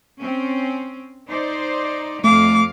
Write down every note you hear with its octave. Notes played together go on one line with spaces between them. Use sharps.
C4 C#4
D#4 C5 D5
F2 A3 F5 D6